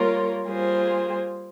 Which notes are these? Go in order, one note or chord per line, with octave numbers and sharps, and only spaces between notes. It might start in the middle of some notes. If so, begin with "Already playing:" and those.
Already playing: G3 A#3 F4 A#4 C#5
G3 A#3 F4 G#4 C5